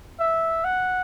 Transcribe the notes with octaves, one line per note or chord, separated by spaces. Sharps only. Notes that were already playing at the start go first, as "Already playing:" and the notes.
E5
F#5